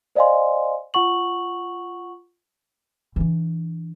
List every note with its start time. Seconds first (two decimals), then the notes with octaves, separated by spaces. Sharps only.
0.15 C5 D5 D#5 F5 G#5 C6
0.94 F4 F#5 C#6 F#7
3.16 E3 D4